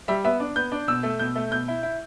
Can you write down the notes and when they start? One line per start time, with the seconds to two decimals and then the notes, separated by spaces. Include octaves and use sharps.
0.08 G3 E5
0.24 B3 E5
0.40 D4
0.56 B3 G6
0.72 D4
0.88 B2 E6
1.03 A3
1.19 B2 G6
1.36 A3
1.51 B2 G6
1.68 E4
1.83 E4